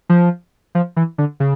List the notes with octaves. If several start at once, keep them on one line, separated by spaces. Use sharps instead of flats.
F3
F3
E3
D3
C#3